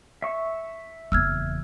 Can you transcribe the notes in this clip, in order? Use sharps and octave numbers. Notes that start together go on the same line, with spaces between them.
E5 C#6
F#1 E2 E6 F6 G#6